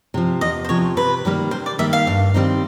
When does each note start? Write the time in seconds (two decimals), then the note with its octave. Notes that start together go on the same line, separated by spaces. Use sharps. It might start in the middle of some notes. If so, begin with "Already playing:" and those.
0.14 C3 F3
0.41 E2 D#5
0.65 C5
0.69 C3 F3 C#5
0.97 C3 B4
1.25 D#3 G3 A#3
1.51 C3 C5
1.66 D5
1.78 D#3 G3 A#3 E5
1.93 F5
2.07 G2
2.34 D#3 G3 C4 D#4